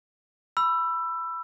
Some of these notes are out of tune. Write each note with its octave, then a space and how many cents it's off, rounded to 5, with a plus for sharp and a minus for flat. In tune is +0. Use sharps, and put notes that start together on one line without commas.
B5 +0 E6 +20